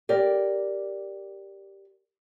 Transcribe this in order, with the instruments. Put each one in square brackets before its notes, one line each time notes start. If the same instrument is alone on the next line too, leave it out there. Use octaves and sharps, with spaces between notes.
[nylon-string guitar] G4 A#4 D5